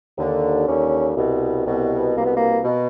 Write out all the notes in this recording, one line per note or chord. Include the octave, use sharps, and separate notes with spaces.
D#2 D3
D#2 D3 C#4
C2 B2
C2 B2
C2 B2 A#3
B3
A#3
B2